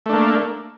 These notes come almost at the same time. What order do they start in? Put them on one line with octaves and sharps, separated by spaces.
A3 D4 A#3